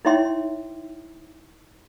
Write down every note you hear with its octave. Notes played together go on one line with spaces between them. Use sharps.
D#4 E4 C#5 E5 G5 C6